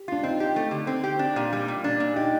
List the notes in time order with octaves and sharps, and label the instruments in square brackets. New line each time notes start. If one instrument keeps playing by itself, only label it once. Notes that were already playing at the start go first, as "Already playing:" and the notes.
Already playing: [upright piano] G4
[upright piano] D4 [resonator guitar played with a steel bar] F4
[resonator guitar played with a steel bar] C4 [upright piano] D#4
[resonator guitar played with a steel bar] G4
A3
D3
C4
G4
D4
A#2
G3
A#2
D4
A#2
[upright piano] D#4 [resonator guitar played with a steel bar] G4